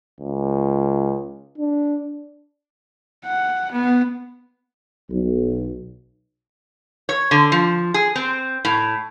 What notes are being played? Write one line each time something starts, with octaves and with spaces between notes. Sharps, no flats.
C#2
D4
F#5
B3
B1
C#5
D3
F3
G#4
C4
A2